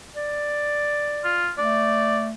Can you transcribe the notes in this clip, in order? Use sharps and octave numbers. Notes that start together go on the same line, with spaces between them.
D5
F4
A3 D5